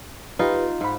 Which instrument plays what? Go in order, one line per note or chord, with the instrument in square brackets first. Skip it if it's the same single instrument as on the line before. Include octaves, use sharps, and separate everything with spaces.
[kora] D#4 F4 [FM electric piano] G4 B4
[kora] G#2 [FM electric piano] F4 B5